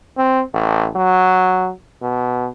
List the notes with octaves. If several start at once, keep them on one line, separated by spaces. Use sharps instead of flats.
C4
A1
F#3
B2